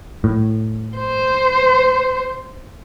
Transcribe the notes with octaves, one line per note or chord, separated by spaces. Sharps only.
A2
C5